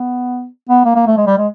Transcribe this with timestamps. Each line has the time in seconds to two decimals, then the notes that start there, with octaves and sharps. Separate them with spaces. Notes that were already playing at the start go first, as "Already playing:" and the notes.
Already playing: B3
0.69 B3
0.85 A#3
0.95 A#3
1.06 A3
1.17 G#3
1.27 G3
1.38 G#3